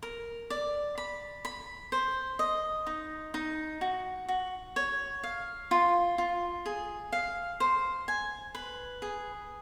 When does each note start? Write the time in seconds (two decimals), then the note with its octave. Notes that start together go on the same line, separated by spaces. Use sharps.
0.03 A#4
0.50 D5
0.98 B5
1.45 B5
1.92 C5
2.39 D#5
2.86 D#4
3.34 D#4
3.81 F#4
4.28 F#4
4.76 C#5
5.23 F5
5.71 F4
6.18 F4
6.66 G#4
7.12 F5
7.60 C5
8.08 G#5
8.55 B4
9.02 G#4